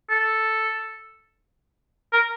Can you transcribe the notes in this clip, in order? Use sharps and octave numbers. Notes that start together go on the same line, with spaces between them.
A4
A#4